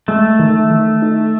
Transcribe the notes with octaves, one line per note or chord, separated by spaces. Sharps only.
G#3 A3
D#3
D#3
D#4